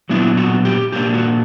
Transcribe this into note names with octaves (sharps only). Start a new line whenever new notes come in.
A#2 F#3 B3 D4 E4
F#4
G4
A#2 A#3 D4 G4
F#4